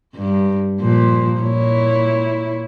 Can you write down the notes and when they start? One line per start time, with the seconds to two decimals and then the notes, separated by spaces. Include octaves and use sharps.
0.15 G2
0.80 A#2 F3
1.40 A#2 E4 C#5